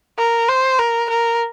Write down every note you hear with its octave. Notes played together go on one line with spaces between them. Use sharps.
A#4
C5
A#4
A#4